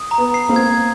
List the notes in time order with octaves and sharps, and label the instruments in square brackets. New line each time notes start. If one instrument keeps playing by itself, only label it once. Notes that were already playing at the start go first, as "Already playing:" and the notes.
Already playing: [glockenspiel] D#6
A#5
[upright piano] B3
[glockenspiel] C7
[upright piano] A#3 C4
[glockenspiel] G#6